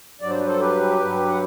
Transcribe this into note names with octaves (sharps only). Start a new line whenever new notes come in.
G2 F#3 D5
C5
B4
A4 C5
G4 B4
G2 F#3
F#5